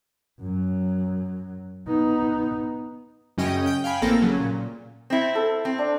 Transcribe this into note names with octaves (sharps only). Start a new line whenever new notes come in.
F#2 F#3
B3 D#4
F#2 C#3 C#4 D#5 G5 D#7
G5 G6
F5 G5 G#5 B5
A1 A#3 C4 A4 A#6
C#3 F#3 C#4
A#2
C4 E4
A4
C4
D4